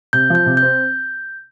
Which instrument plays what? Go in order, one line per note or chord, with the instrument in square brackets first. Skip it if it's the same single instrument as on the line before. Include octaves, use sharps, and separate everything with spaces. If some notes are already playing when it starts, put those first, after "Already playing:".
[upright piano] C3 [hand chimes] G6
[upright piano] F3
[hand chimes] G6
[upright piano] C3
[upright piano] C4 [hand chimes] G6